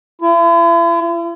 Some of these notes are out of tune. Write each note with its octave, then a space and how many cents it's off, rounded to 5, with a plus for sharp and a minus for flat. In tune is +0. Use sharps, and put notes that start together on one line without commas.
E4 +45